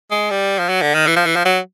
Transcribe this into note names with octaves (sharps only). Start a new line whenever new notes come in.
G#3
G3
F3
F#3
D3
D#3
E3
F3
E3
F3
F#3